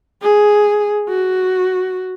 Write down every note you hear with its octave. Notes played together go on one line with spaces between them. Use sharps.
G#4
F#4